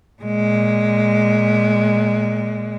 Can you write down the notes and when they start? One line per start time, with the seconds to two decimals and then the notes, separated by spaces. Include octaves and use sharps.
0.22 A#2 G#3